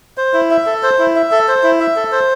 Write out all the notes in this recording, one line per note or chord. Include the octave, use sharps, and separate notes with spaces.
C5
E4
E5
A4
C5
E4
E5
A4
C5
E4
E5
A4
C5